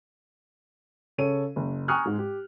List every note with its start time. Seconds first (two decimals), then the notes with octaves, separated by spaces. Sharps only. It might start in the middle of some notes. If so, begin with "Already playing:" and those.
1.18 C#3 A4 C#5 D#7
1.56 F#1
1.88 G#5 A#5 C#6 D#6 F6 F#6
2.06 G#2 G#3
2.18 G4